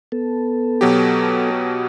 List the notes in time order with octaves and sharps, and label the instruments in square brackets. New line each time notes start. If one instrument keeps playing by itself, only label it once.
[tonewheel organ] B3 A4
[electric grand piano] B2 F#3 G4